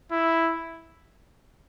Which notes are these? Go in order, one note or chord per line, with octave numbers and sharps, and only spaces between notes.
E4